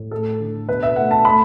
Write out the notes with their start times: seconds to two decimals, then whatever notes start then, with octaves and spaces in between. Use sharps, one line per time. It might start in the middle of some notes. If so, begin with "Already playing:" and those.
Already playing: A2
0.11 A3 A4
0.40 D3
0.68 B2 B4
0.83 E5
0.96 A3 F#5
1.11 A5
1.25 A3 B5